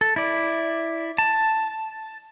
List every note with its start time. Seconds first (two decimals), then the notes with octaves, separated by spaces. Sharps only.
0.01 A4
0.16 E4 D5
1.18 A5